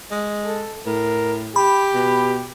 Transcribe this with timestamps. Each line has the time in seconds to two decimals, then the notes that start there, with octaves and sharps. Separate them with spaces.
0.11 G#3
0.45 A4
0.86 A2 A#4
1.56 G4 B5
1.94 B2